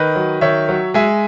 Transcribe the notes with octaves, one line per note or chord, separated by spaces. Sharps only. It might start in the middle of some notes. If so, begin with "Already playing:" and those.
Already playing: D#3 B4 D#5
F#3
D#3 C#5 E5
F#3
G#3 E5 G#5